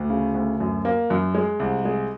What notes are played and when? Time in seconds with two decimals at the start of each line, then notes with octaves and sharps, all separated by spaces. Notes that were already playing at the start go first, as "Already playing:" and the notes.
Already playing: D2
0.10 C#3
0.34 D2
0.60 F#2
0.85 A#3
1.10 F#2
1.35 G#3
1.60 C2
1.85 G#3